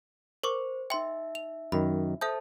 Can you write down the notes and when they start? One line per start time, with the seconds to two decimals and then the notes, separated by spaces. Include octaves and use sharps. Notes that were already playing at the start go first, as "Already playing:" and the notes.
0.44 A#4 C5 C#6 D6
0.90 D#4 E5 G5 C6
1.35 F7
1.72 F#2 D#3 B5
2.21 A4 C5 E5 A5 D#6 G6